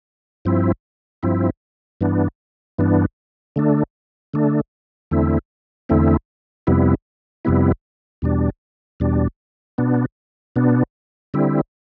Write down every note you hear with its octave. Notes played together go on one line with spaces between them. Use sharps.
G2 F3 C4 E4
G2 F3 C4 E4
G2 E3 B3 D4
G2 E3 B3 D4
D3 A3 D4
D3 A3 D4
E2 D3 A3 C4 E4
E2 D3 A3 C4 E4
F2 C3 G3 B3 E4
F2 C3 G3 B3 E4
E2 B2 G3 D4
E2 B2 G3 D4
B2 B3 D4
B2 B3 D4
D3 G3 C4 E4